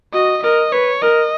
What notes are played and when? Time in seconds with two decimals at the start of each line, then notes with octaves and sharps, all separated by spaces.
0.13 F#4 D#5
0.43 A#4 D#5
0.72 B4 C#5
1.02 A#4 D#5